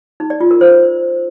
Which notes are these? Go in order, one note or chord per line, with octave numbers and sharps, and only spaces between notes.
D#4
D5
F4
A#4
C5